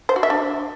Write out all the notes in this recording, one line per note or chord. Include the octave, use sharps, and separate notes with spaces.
C5
F#4
E5
D4